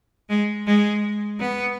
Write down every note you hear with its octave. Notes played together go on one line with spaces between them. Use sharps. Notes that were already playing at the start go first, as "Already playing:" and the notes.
G#3
G#3
B3